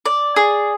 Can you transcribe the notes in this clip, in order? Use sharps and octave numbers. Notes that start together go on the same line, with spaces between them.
D5
G#4